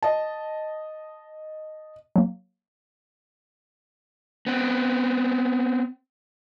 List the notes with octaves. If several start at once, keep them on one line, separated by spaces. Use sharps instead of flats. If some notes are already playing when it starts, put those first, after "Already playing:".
D#5 A5
F#3 A#3
B3 C4